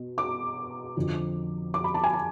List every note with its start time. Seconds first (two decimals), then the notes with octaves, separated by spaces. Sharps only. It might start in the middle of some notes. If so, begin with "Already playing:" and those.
Already playing: B2 B3
0.18 D6
0.97 F2 D3 F3
1.74 D6
1.84 B5
1.94 A5
2.04 G#5
2.13 A5